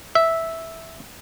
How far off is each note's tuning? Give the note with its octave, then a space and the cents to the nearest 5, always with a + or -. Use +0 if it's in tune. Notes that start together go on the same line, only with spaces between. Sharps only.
E5 -5